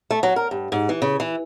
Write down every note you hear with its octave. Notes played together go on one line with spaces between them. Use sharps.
A3
F#3
A#4
G2
G#2
E3
C#3
E3